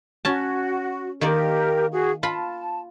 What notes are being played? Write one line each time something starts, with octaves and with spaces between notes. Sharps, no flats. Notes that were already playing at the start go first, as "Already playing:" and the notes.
C#4 F#4 A5
D#3 A#3 G4 A#4 D5
F#4 G#4
F4 A5 B5